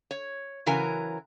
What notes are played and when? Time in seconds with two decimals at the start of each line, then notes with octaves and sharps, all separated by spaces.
0.11 C#5
0.66 C#3 E3 F#3 A#4 G#5